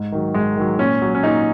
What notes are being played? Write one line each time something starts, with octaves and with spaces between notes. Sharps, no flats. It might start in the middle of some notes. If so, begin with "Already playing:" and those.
Already playing: G#2
D#3 F#3
G#2 G#3
D#3 F#3
A#2 C#4
F#3
C#4
A#2 D#4